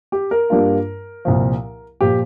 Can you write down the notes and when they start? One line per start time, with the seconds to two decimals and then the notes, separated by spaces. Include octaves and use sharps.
0.12 G4
0.31 A#4
0.50 G2 G3 A#3 D4 F4
1.25 C2 A#2 F3
2.01 A#2 F3 G4